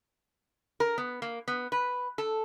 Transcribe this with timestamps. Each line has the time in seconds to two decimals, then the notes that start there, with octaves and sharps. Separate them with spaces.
0.80 A#4
0.98 B3
1.22 A#3
1.48 B3
1.72 B4
2.18 A4